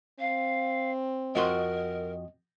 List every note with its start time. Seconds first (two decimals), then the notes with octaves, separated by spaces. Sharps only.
0.19 C4 F5
1.35 F2 F#4 A#4 D#5 C6